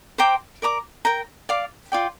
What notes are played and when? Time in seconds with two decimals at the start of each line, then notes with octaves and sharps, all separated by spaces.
0.18 C5 G5 A#5 D6
0.62 A#4 D5 A#5 D6
1.05 A#4 G5 A#5
1.49 D5 F5 D6
1.92 F4 D5 G5